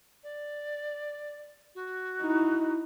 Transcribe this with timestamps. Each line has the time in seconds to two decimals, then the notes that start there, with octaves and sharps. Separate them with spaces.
0.23 D5
1.75 F#4
2.21 D#4 E4